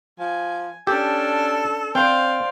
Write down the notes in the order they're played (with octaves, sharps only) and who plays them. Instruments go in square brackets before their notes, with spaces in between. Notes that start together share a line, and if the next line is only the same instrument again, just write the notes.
[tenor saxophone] F3 [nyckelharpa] G#5
[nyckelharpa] C#4 D4 [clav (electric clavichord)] G4 [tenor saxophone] A4
[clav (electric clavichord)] C4 [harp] C5 G5 [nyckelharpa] D5 F5